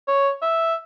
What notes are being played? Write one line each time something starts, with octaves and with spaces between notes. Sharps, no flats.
C#5
E5